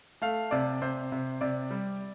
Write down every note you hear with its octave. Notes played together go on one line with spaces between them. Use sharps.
A3 F5
C3 D5
C3 C5
C3
C3 D5
G3